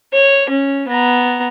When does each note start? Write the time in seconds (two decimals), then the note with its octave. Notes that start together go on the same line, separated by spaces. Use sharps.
0.13 C#5
0.50 C#4
0.88 B3 A#5